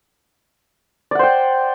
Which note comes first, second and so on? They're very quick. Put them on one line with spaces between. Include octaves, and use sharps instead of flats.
D5 F#5 C5 G5